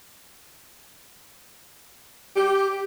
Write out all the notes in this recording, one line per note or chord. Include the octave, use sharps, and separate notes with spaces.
G4